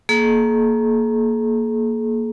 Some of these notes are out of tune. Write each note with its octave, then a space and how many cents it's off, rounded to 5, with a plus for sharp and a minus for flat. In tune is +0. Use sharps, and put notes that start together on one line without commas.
A#3 +0 G#4 +45